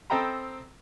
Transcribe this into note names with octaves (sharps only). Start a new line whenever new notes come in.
C4 A4 D#5 G5 A#5 B5